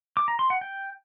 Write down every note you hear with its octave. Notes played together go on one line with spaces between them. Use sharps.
D6
A#5
C6
F#5
G5